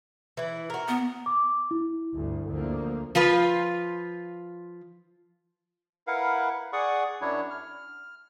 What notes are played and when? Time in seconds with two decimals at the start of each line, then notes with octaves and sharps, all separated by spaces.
0.37 E3 E4
0.70 F#4 A#4
0.88 B3
1.26 D6
1.71 E4
2.13 G1 D2
2.49 D2 F3 A#3
3.15 F3 F4 B4
6.07 E4 A#4 B4 F5 F#5
6.73 G#4 D5 F#5 C#6 D#6
7.22 F#2 F#3 D4 E4 C#5
7.50 F6